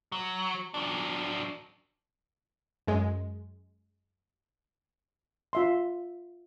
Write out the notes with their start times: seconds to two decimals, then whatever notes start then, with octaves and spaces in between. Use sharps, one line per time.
0.12 F#3
0.74 F#3 D4
2.87 F#2 G#3
5.53 F4 E5 C6